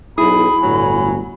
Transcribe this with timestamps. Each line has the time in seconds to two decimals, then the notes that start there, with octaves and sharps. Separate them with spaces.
0.18 B1 E4 G#4 B5
0.63 G1 A2 F#3 G#5